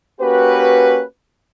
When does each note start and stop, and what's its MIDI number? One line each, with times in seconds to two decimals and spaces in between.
0.21 1.03 58
0.21 1.03 61
0.21 1.03 66
0.21 1.03 67
0.21 1.03 71